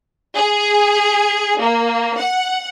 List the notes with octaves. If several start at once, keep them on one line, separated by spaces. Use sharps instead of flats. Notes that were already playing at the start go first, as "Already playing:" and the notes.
G#4
A#3
F#5